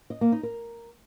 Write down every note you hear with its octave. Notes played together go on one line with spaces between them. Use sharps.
D#5
A#3
D#4
A#4